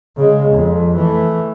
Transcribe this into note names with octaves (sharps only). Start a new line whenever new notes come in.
C#3 G#3
F2
E3 A3